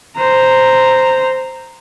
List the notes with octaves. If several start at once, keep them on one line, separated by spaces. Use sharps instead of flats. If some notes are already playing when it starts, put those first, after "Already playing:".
C5 A#5